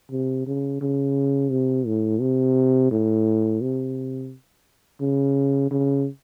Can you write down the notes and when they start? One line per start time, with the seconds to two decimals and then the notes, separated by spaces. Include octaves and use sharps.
0.11 C3
0.47 C#3
0.81 C#3
1.51 C3
1.87 A2
2.21 C3
2.91 A2
3.61 C3
5.01 C#3
5.71 C#3